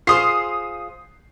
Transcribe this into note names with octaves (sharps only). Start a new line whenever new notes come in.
F4 G#4 C5 D#6 C7